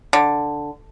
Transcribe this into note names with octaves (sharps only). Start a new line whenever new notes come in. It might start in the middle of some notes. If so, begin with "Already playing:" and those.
D3